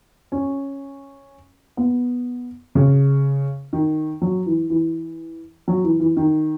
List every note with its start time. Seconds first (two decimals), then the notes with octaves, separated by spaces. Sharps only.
0.32 C#4
1.77 B3
2.75 C#3
3.73 D#3
4.22 F#3
4.46 E3
4.70 E3
5.68 F#3
5.84 E3
6.00 E3
6.17 D#3